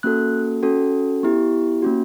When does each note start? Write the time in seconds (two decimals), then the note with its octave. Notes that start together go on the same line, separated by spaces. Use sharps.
0.03 A#3 C#4 F#4 A4 F#6
0.63 C#4 F#4 A4
1.23 B3 E4 G4
1.82 A#3 C#4 F#4